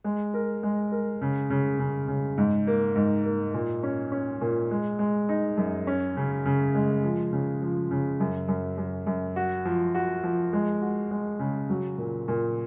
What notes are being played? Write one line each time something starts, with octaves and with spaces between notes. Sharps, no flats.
G#3
A#4
G#3
A#4
C#3
C#3
C#3
C#3
G#2
A#3
G#2
A#3
A#2
C#4
C#4
A#2
G#3
G#3
D#4
F#2
C#4
C#3
C#3
G#3
F3
C#3
F3
C#3
F#2
F#2
F#2
F#2
F#4
F3
F#4
F3
G#3
F#4
G#3
C#3
F#3
A#2
A#2